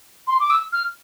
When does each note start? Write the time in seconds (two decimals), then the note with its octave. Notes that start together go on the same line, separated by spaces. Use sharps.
0.27 C6
0.40 D6
0.50 E6
0.73 F6